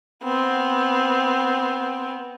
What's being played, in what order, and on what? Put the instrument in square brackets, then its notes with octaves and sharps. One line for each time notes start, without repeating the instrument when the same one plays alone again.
[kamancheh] B3 C4